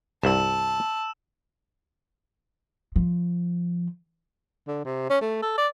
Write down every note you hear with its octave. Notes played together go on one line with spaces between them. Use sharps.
C2 G2 A5 E6 E7
F3
D3
C3
C#4
A3
A4
D5